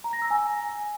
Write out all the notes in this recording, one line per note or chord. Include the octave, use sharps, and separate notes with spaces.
A#5
A#6
E6
G#5